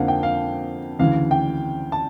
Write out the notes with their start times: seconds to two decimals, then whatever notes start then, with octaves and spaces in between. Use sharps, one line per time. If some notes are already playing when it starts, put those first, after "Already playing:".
Already playing: F2 D3 F3 A#3 F5 F#5
0.08 G5
0.23 F5
0.99 D2 C#3 E3 F5
1.31 G5
1.92 A5